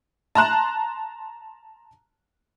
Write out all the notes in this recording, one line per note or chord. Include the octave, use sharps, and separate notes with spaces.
A5 A#5 C6 F#6 E7